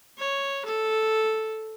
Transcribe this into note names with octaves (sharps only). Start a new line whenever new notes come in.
C#5
A4